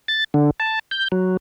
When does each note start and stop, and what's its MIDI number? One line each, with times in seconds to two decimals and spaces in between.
0.08 0.24 93
0.34 0.51 50
0.60 0.79 81
0.91 1.08 91
1.12 1.37 54